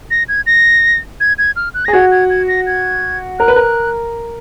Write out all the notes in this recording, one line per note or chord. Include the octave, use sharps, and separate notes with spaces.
A#6
G#6
A#6
G#6
G#6
F6
F#6
G#4 A#6
F#4 G#6
G#6
G#6
A#6
G#6
A#4 F#6
B4
A#4